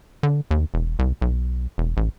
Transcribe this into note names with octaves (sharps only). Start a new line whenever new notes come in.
D3
D#2
E1
C2
B1
E1
A1